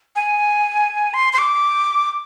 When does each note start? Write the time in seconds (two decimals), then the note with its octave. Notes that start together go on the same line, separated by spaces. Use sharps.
0.16 G#5
1.14 C6
1.33 C6
1.39 D6